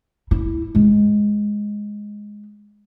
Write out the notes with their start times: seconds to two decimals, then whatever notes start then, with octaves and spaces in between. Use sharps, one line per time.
0.31 E4
0.75 G#3